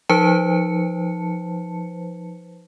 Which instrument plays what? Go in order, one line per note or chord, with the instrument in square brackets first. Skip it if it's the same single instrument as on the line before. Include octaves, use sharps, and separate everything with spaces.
[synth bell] F3 D#4 B4 C5 A5 C#7